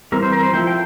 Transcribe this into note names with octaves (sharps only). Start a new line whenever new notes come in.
E3 G3 C4 A#4
C5
A#4
C5
F3 A3 E4 G5
G5